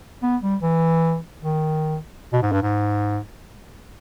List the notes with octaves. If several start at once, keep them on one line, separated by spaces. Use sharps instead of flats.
B3
G3
E3
D#3
B2
G#2
G2
G#2